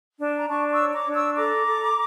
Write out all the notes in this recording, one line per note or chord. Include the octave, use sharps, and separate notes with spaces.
D4
A#5
D4 A5 C#6
C#6 E6
C#5
A#5 D6
D4
C#6 E6
A4 A#5 D6
A4